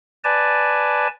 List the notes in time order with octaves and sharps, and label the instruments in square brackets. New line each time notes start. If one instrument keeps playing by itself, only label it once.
[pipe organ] B4 D5 G#5 A5